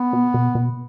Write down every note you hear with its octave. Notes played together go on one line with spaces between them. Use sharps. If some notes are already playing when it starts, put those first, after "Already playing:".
Already playing: B3
B2
B2
B2